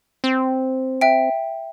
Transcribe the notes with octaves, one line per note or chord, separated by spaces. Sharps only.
C4
E5 G5